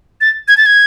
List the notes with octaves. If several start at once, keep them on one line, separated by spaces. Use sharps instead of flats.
A6
G#6
A6
G#6